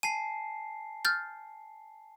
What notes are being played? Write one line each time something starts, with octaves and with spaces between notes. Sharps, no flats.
G#5 A5 C7 D#7
F6 G6 A6